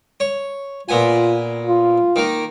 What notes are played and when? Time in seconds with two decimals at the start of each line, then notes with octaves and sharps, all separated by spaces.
0.20 C#5
0.89 A#2 B3 F4 G#5
1.67 F4
2.16 D#3 A#3